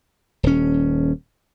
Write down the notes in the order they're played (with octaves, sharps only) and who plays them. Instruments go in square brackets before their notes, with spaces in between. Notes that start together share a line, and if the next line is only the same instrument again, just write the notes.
[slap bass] D#1 C#4